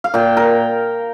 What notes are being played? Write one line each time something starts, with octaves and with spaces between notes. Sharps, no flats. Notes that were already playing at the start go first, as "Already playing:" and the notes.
F5
A#2 G5
A#4